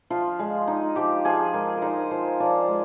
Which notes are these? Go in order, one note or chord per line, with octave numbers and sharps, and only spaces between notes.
F3 F4
G#3
D#4
F3 G4
F3 G#4
G#3 A#4
A#4
D#4 C5
F3 C5
F3 D5
G#3